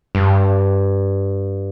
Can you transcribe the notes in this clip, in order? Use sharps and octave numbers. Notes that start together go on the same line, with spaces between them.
G2